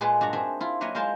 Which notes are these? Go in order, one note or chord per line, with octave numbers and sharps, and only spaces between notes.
A#2 G#3 G#4 B4 A5 C6
G2 D4 F#4 A#5
C4 G#4 E5
E4 F4
F#3 A#3 B4 C#5 D#5 E5
G#3 F4 A#4 C5 A5 C6